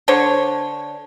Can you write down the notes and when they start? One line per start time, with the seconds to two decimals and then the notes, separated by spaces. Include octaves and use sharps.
0.08 D3 C5 C#5